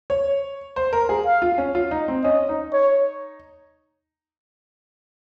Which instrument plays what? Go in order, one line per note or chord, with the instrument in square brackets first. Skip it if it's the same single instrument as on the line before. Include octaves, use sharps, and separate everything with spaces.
[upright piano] C#5
C5
A#4
G#4
[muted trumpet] F5
[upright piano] F4
C#4
F4
D#4
C4
[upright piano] C#4 [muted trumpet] D#5
[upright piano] D#4
[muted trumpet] C#5